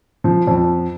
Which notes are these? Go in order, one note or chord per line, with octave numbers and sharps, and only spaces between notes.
F3
F2